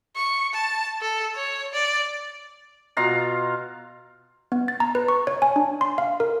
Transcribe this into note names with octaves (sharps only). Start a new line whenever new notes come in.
C#6
A5
A4
C#5
D5
B2 F4 F5 A#5
B3
A6
A#5
B4
C#6
C#5
G#5
D4
C6
F5
A#4